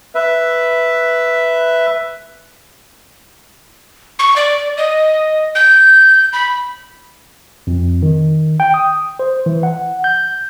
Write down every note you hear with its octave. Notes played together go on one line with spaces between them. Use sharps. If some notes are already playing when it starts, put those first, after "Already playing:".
B4 E5
C#6
D5
D#5
G6
B5
F2
D#3
G5
D#6
C5
E3
F#5
G6